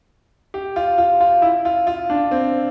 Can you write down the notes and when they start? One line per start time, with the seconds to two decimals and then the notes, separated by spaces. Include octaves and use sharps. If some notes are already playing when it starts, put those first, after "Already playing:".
0.54 G4
0.76 F4
0.98 F4
1.20 F4
1.42 E4
1.65 F4
1.87 F4
2.10 D4
2.31 C4